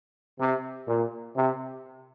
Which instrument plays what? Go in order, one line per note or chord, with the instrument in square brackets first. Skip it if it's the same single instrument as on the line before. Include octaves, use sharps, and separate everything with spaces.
[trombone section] C3
A#2
C3